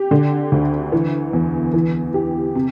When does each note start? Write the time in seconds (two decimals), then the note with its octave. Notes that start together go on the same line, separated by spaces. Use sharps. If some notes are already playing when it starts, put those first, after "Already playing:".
Already playing: G4
0.11 D3
0.52 D2
0.92 E3
1.33 E2
1.74 E3
2.14 G4
2.55 C3